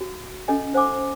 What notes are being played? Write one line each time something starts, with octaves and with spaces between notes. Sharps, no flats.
F#4
C#4 A4 D#5 G#5
D#4 C5 F#5 G#5 D6